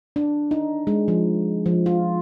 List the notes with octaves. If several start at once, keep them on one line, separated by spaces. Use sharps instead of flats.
D4
D#4
G#3
F3
F3
F4